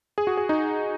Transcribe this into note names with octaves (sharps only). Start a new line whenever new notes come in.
G#4
F#4
G#4
D#4